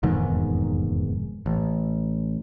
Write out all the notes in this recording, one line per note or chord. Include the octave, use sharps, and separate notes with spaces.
F1 E2 G#2 D#3
A1